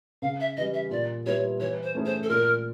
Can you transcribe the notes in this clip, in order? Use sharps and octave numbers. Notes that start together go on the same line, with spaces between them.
C#3 F5
E5
E3 G3 D#5
E5
A#2 D5
G3 B3 E4 C#5
E3 C#5
C5
A3 C#4 E4 G#4
C5
A4
A#2 A#4